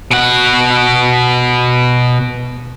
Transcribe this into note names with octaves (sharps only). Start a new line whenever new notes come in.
B2 F#5